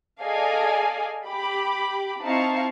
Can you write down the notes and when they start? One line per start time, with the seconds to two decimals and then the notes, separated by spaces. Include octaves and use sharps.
0.23 G#4 A4 D5 D#5 F5 G#5
1.26 G4 B5 D6
2.23 C4 D#4 E4 F5 A5 C#6